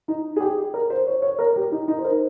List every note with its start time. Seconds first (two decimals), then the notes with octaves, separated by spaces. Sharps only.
0.08 D#4
0.36 G#4
0.40 G4
0.74 A#4
0.90 C5
1.07 C#5
1.22 C#5
1.39 A#4
1.56 G4
1.72 D#4
1.88 D#4
1.99 C5
2.05 A#4